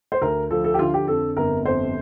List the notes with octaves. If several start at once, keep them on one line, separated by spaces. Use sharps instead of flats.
C5
D2 A#4
F3 A4
A4
G4
D3 F4
G4
F2 A4
G1 A#4
F2 C5